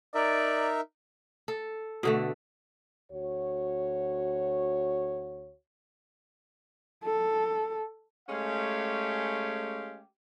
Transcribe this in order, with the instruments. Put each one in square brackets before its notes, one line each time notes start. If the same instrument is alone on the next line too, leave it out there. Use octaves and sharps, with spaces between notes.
[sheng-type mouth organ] D#4 A#4 E5 [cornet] D5
[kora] A4
B2 D3 A3
[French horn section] D2 F#4 C#5
[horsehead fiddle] A4
[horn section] G#3 A3 C#4 G4 F5